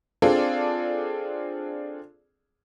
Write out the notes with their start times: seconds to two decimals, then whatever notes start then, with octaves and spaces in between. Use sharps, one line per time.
0.22 C4 D4 F4 G#4 A4 D5